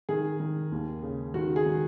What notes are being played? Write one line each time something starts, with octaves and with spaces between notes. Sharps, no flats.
D#3 G#4
D#3
D#2
C#3
D#3 F#4
G#4
D#3